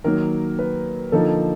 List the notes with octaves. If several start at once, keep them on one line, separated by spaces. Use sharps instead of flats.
D#3 F#3 A#3 A#4
B4
D3 F3 A#3 D#4 A4